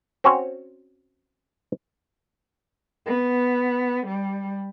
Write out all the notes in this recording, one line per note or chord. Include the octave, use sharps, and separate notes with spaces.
C4 C#4 F#4 C5 C#5
B3
G3